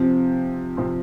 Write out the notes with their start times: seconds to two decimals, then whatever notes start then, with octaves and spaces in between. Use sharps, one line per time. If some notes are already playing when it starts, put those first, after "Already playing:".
Already playing: C3 F3 C4
0.77 C3 F3 C4